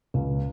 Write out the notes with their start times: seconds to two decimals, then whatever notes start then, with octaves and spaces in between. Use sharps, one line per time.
0.14 C#2